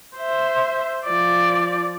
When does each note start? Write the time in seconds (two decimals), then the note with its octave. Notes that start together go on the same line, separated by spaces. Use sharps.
0.17 C5 E5
1.06 F3 D5